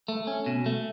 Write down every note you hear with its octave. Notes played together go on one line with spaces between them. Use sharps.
A3
C#4
B2
A3